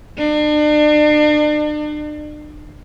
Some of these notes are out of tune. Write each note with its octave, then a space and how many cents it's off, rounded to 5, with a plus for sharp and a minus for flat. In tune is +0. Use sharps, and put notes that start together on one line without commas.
D4 +40